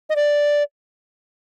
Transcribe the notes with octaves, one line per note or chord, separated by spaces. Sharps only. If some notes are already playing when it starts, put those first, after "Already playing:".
D#5
D5